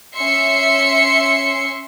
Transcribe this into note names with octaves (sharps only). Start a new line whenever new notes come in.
C#4 E5 C6 C7 C#7